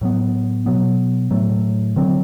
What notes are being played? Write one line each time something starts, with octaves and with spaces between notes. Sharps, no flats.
A2 F#3 B3
B2 F#3 B3
A2 F#3 A3
D3 F#3 C4